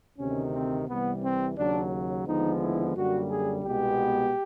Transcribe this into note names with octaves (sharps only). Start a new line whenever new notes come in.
D2 C3 D#3 C#4
C4
C2 C3 E3 G3 B3
C4
D#2 C#3 F#3 D4
D#2 D3 F3 G#3 B3 D#4
E4
F#2 D3 G3 A#3 F#4
G#4
C2 B2 G#3 B3 G4